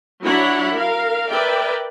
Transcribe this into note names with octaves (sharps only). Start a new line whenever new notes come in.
F#3 D4 E4 C#5 F#5 B5
A#4 F5
A#4 B4 D5 E5 G5